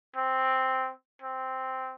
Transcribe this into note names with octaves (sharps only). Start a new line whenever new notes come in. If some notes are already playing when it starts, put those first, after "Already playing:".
C4
C4